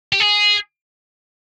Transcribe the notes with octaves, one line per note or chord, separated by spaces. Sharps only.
G4
G#4